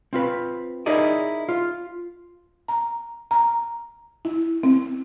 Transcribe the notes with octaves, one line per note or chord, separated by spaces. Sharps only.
C4 F4 B4
D#4 E4 G#4 A#4 D5 D#5
F4
A#5
A#5
E4
C4